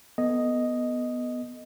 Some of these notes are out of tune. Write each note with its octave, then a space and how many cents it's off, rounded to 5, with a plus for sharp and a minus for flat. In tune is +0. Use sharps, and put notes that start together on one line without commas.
B3 +0 A4 +5 D#5 +0